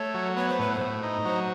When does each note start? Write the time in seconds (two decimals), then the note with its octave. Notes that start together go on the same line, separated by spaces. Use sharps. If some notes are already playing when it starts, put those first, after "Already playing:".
Already playing: A3 C#5
0.14 F#3
0.36 B3 C#5
0.49 C5
0.59 A2 B4
0.72 C5
0.81 A2
1.03 D#4
1.25 F#3 C5